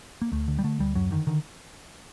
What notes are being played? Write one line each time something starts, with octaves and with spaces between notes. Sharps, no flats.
A#3
D2 A3
D3
G3
D3 A3
D2 G3
F#2 F#3
D3 D#3
D3 D#3